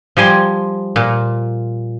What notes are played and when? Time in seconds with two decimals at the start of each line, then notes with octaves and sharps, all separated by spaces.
0.17 F3 G3 G#5 C6
0.96 A#2